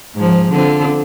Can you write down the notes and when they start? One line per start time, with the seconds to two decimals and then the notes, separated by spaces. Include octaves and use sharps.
0.15 G#2 F3
0.52 D3 C4 F4